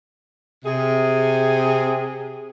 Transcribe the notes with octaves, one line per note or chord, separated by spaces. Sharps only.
C3 G#4